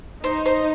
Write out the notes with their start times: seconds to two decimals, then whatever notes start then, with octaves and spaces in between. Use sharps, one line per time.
0.24 D#4 C5
0.46 C5